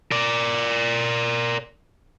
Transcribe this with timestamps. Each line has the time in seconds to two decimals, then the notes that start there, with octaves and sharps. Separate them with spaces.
0.12 A#4 D5